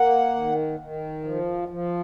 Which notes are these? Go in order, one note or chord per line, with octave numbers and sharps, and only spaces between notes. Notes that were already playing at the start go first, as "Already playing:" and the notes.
Already playing: A#3 F#5
D#3
D#3
F3
F3